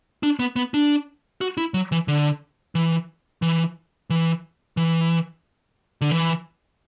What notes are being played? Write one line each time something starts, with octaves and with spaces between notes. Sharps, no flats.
D4
B3
B3
D4
F#4
E4
F#3
E3
D3
E3
E3
E3
E3
D3
E3